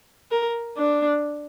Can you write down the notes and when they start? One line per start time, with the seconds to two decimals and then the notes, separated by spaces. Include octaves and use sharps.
0.31 A#4
0.78 D4